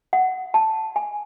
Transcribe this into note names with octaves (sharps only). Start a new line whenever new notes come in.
F#5
A5
G#5